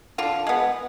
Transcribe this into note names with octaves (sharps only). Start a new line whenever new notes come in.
D3 F4
G#3 B3